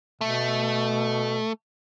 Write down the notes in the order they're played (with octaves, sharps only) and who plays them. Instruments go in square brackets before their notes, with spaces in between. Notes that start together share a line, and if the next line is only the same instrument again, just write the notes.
[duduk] B2 [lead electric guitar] A3